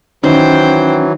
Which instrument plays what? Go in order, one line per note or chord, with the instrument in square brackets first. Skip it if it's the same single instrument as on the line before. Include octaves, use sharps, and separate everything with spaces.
[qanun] D#3 [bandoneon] E3 F#3 [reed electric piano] C#4 [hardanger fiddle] C5 G5